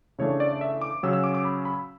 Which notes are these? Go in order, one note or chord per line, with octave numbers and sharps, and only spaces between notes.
C#3 E3 A3 D4 C#5
D5
E5
D6
C#3 F#3 C#4 E6
E6
D6
D6
B5
B5